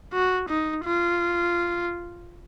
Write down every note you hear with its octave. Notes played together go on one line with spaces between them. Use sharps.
F#4
D#4
F4